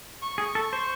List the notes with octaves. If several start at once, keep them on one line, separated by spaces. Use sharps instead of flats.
C#6
G#4
A4
C5